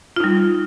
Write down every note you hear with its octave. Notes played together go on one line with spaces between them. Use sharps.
G3 D#4 F4